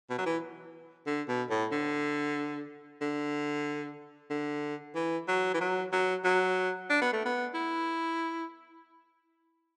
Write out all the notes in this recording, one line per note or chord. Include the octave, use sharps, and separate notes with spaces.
B2
F#3
E3
D3
B2
A2
D3
D3
D3
E3
F#3
E3
F#3
F#3
F#3
D4
B3
A3
B3
E4